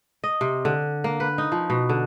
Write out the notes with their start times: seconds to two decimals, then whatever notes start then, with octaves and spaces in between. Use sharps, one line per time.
0.24 D#5
0.41 C3
0.65 D3
1.04 A#3
1.20 B4
1.38 D#4
1.52 F3
1.70 B2
1.89 D3